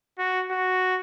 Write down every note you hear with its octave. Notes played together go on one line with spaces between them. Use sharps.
F#4
F#4